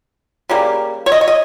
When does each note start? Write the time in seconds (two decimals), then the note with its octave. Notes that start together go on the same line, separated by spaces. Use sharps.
0.49 C#3 G3 A#3
1.06 C#5
1.12 D#5
1.21 C#5
1.28 D#5